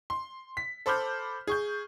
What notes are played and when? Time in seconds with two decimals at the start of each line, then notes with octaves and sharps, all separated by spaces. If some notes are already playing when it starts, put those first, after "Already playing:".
0.10 C6
0.57 B6
0.86 A4 C5 B5 D6 F6 G6
1.47 G#4 C#6 G6